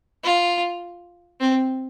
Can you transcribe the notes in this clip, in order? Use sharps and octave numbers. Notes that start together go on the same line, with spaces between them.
F4
C4